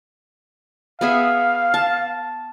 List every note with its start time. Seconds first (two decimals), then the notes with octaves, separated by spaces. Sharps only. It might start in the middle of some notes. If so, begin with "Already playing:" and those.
1.01 B3 G#4 E5 F5
1.74 A5